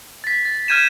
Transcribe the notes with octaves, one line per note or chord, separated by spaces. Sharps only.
A6 B6
A6
F6 G6 G#6 D#7 E7